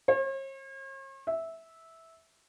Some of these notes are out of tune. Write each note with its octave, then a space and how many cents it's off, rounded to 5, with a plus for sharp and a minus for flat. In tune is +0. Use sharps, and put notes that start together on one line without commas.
C#5 -45
E5 -10